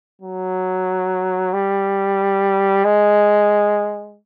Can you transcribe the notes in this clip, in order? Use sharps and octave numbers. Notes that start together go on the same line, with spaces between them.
F#3
G3
G#3